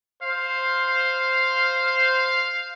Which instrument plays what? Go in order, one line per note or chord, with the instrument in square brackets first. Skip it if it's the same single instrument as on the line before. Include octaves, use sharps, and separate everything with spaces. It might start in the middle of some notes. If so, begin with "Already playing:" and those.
[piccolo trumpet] C5 [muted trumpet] F5